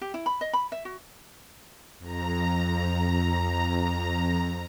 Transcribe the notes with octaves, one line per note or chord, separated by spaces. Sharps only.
G4
E4
B5
D#5
B5
E5
F#4
F2 A#5